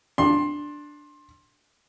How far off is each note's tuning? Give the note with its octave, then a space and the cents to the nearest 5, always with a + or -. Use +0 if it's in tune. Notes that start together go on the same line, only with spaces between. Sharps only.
D4 +0 C6 +20